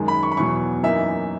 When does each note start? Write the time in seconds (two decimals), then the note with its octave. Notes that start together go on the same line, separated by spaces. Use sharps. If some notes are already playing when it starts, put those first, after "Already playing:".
Already playing: F#2 D#3 G#3
0.08 B5
0.23 C#6
0.32 B5
0.37 E2 B2 F#3 C#6
0.83 F#2 E3 A#3 D#4 E5